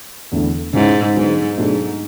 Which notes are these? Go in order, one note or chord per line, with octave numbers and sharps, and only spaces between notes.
E2 D3 A3 E4
G#2 C#3 G#3 C#4 E4
G#2 D3 F#3 B3 D4 G#4
G#2 B2 F#3 A3 D4 G#4